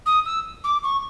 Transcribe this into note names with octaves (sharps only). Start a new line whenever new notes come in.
D#6
E6
D6
C#6